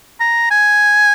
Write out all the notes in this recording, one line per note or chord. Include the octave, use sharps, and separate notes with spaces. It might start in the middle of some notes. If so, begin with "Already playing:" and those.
A#5
G#5